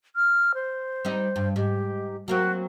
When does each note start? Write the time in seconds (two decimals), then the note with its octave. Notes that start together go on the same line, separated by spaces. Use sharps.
0.16 F6
0.54 C5
1.05 G3 C4 D#4
1.36 G2
1.56 G#2 G4
2.28 F#3 A#3 C4 F#4